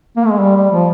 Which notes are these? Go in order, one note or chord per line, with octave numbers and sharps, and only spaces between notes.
A#3
A3
G#3
G3
G3
F3